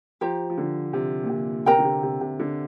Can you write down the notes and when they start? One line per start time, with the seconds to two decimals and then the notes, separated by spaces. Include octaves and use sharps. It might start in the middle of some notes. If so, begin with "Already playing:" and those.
0.21 F3 G4 C5 A#5
0.50 F3
0.58 D3
0.93 C3
1.24 A#2
1.29 C3
1.66 C3 A#4 G5 A#5
1.79 D3
1.85 C3
2.03 C3
2.21 C3
2.40 D3